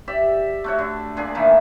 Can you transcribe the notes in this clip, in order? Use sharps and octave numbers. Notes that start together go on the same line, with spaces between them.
G4 D5 E5
A3 F#4 C#5
D3
A#2 D4 G#4
A2 D#3 E3 A#3